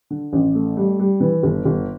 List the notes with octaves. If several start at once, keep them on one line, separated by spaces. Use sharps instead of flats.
D3
A1
A3
G3
G3
E3
G1
G1